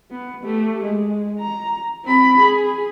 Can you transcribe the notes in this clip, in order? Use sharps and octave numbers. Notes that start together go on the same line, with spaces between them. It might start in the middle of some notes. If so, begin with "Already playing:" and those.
B3
A3 G4
G#3
A#5
C4 B5
G#4